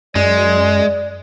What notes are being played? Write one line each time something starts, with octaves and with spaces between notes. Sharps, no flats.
F#2 G#3 D5